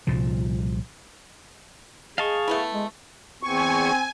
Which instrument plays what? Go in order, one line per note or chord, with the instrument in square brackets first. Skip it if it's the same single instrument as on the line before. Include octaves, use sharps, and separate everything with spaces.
[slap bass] C2 A#2 F3
[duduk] G#4 [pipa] D#5 [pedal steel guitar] F5 A5 C#6
[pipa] A3 B3 E4
[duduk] G#3
[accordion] E2 C#6 [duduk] C4 [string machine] G#5